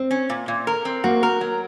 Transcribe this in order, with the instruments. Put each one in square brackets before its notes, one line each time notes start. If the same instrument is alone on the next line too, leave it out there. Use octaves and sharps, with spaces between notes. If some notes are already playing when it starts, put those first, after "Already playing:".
Already playing: [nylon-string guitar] C4
[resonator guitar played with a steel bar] C#4
A#2
A#2
A#4
C4
[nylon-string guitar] A#3 [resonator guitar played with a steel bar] F#4
[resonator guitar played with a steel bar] A#4
F#3